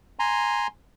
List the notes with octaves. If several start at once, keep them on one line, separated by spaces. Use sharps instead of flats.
G#5 A#5 C6